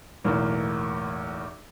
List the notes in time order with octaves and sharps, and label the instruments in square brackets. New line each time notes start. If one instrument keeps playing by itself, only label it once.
[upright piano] B1 E2 A2 A#3